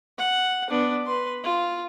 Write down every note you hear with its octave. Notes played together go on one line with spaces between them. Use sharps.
F#5
B3 D4
B4 C6
F4